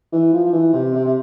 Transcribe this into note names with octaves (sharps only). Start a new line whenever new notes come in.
E3
F3
F3
E3
C3
C3
C3